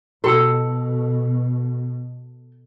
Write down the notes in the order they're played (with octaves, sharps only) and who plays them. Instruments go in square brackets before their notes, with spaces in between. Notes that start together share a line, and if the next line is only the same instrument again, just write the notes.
[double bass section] B2 [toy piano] F#4 G5 E6 [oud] A4